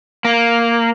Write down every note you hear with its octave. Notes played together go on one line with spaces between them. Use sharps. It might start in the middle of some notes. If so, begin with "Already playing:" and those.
A#3